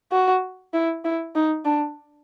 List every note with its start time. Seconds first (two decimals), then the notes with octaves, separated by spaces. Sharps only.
0.12 F#4
0.74 E4
1.05 E4
1.35 D#4
1.65 D4